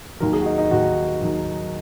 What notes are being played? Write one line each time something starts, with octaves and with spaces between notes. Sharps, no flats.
D#2 D#3 F#3 A#4
G#4
F#4
D#4
D#4
D#2 D#3 F#3 F#4
D#2 D#3 F#3